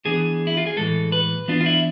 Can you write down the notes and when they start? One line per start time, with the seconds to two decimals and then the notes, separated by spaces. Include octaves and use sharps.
0.05 E3 B3 D4 G#4
0.47 E4
0.57 F4
0.67 G#4
0.77 A2 E3 G#3 A4
1.12 B4
1.48 E3 B3 D4 F4
1.61 F4
1.66 E4